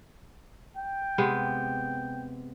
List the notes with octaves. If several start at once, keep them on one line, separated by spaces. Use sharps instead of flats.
G5
C3 G#3 B3